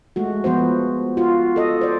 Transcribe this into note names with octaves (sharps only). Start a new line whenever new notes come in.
G#3 A3 F#4
F3 B3 F#4 C5
F4 F#4
A4 D#5
C5 D5